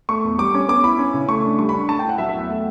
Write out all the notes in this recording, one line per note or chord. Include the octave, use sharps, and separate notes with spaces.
A3 C#6
E2
G3 D6
C#4
B3 D6
E4 B5
C#4
C#3
A3 C#6
D4
G3 C#6
D4 B5
A3 A5
E4 G5
F#5
F#3 E5
E5
E2 F#5
A3